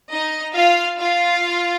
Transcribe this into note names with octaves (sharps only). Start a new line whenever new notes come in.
D#4 D#5
F4 F5
F4 F5